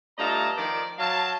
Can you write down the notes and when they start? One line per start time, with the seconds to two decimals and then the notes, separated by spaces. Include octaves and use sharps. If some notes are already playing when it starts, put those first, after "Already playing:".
0.18 G2 A3 F4 D#5 A5 A#5
0.56 D#3 F3 D5
0.98 F#3 F5 A5